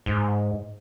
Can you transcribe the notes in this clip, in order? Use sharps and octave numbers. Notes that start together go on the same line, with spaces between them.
G#2